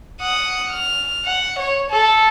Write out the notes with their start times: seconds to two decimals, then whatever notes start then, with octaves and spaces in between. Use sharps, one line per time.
0.21 F#5 D#6
0.70 F6
1.25 F#5
1.59 C#5
1.91 A4